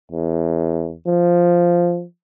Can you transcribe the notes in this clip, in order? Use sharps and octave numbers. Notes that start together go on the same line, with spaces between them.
E2
F3